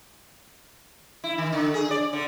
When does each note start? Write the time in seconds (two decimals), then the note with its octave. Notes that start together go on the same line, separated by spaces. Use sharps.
1.24 E4
1.38 D#3
1.52 D3
1.74 G#4
1.91 D5
2.13 D3